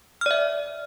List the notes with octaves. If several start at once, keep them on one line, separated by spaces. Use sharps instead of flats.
D5 E5 F6